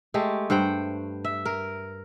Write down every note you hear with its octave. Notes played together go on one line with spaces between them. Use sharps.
G#3 A3 G4
G2 C5 F#5 G5
E5
A#4